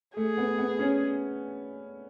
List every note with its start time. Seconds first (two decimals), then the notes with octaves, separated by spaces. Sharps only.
0.16 A3 G#4
0.37 B3
0.58 B3
0.79 C#4